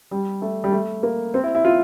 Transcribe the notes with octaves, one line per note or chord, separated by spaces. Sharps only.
G3
A3
G3
A3
A#3
C4
E4
E4
F4